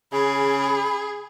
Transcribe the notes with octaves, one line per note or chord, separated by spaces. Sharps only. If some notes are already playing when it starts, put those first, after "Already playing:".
C#3 G#4 B5